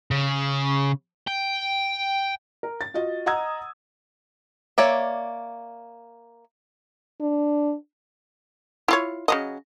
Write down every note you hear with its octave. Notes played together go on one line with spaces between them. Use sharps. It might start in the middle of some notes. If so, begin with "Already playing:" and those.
C#3
G5
A#4
A6
F4 F#4 D#5
D#5 F#5 A#5 D#6 E6 G#6
A#3 C#5 D5 E5
D4
E4 F4 C#5
C#3 F#3 D#5